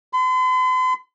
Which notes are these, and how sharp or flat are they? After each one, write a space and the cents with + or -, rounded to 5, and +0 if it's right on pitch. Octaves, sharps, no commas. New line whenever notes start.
C6 -45